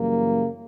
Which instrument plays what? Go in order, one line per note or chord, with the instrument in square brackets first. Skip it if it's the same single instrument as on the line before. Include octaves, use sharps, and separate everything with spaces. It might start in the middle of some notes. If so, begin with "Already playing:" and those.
Already playing: [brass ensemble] F#2 C#3 E3 G3 A#3